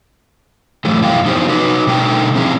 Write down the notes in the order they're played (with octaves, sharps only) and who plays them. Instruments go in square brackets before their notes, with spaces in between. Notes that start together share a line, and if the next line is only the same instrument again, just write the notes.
[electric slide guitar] F#2 A2 E3 G3 A3
F#2 E4 F5 G5
F3 B3 D#4 E4 G4 C5
D#4 F#4 B4
B2 D3 G3 D#4 A4 G5
F3 G3 C4 E4 G#4 A#5